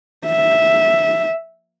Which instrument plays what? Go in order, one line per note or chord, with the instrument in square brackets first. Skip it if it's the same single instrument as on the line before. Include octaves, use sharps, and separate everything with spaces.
[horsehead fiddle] E5